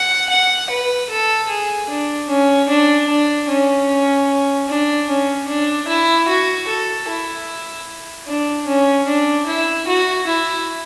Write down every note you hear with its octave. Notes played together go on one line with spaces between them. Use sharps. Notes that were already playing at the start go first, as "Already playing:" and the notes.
Already playing: F#5
F#5
B4
A4
G#4
D4
C#4
D4
D4
C#4
D4
C#4
D4
E4
F#4
A4
E4
D4
C#4
D4
E4
F#4
E4